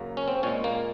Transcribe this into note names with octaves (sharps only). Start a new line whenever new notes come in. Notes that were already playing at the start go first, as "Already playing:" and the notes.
Already playing: F#2 C#3 F#3 A#3
C#4
C4
A#2 G#3 C#4
A#3